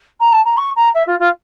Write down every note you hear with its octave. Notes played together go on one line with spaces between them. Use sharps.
A#5
A5
A#5
C#6
A#5
E5
F4
F4